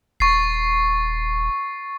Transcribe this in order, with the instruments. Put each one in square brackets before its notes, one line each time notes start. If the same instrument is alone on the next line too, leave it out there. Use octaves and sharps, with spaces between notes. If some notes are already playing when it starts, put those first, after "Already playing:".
[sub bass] D#1 [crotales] C#6 A6 C7